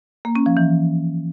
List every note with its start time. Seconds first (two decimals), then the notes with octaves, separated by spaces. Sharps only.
0.25 A#3
0.35 C#4
0.46 F3
0.57 E3